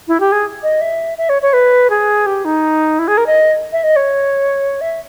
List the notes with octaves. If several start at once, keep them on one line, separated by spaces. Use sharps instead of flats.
E4
G4
G#4
D#5
E5
E5
C#5
C#5
B4
G#4
G4
D#4
E4
G#4
A#4
D#5
E5
D#5
C#5
E5